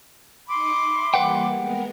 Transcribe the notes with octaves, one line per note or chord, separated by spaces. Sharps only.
D#4 B5 C6 D6 D#6 C#7
E5
E3 G3 A#3 B4 F#5 G5
G#3 B3 A#4